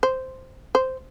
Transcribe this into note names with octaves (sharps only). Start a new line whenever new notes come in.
C5
C5